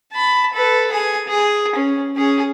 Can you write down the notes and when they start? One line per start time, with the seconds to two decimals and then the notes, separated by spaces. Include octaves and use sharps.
0.12 A5 B5
0.53 A4 B4
0.91 G#4 G#5
1.27 G#4
1.75 C#4
2.16 C#4 G#4